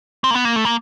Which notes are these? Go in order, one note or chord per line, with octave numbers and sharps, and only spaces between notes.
C4
A#3
B3
A#3
A3
A#3